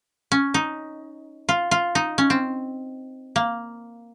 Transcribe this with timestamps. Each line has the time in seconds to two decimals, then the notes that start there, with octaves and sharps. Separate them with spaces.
0.32 C#4
0.54 D#4
1.49 F4
1.71 F4
1.95 D#4
2.18 C#4
2.30 C4
3.36 A#3